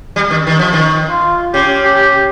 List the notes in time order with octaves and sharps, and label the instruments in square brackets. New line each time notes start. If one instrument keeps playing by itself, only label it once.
[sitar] G3
D#3
D#3
F3
D#3
[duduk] F4
[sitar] C#3 [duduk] G4
[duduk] G4
G4